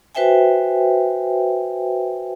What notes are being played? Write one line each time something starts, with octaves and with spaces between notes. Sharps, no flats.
F#4 B4 C5 E5 G5 G#5